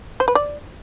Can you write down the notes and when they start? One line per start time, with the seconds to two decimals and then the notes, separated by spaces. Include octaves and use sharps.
0.20 C5
0.28 B4
0.35 D5